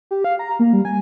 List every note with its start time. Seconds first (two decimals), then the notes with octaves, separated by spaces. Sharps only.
0.11 G4
0.24 F5
0.39 A#5
0.59 A#3
0.73 G3
0.85 G#5